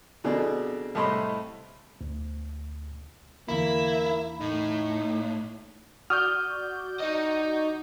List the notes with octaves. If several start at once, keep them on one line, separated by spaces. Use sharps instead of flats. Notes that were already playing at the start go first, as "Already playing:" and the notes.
F2 B2 D3 G#4 D5
C2 A2 A3 D#5 B5 C6
D2
E2 D3 A#3 E4 B5
A2 D#4
F#4 D5 D#6 F6 G6
D#4 D#5